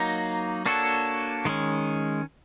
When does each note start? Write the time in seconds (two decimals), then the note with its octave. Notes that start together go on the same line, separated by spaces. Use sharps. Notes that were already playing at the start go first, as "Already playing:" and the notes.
Already playing: F#3 A#3 D#4
0.66 A#3 D4 F#4 A4 C#5
1.45 D#3 G#3 C#4